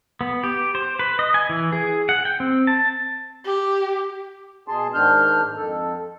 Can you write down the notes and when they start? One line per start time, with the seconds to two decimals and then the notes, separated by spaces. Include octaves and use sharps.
0.21 B3
0.44 G4
0.75 C5
0.99 B4
1.19 D#5
1.34 G#5
1.49 E3
1.73 G#4
2.09 F#5
2.25 G5
2.40 C4
2.67 A5
3.45 G4
4.68 B2 G#4 A5 C6
4.94 G#2 D#3 D4 F6 G6
5.56 F2 A4